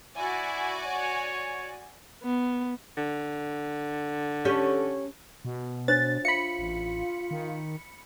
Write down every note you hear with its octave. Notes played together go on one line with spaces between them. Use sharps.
E4 F#4 D5 G#5
C#5
B3
D3
C#4 G4 A4
B2
D4 C5 C#5 A6
F4 E5 B5 C#7
A1
D#3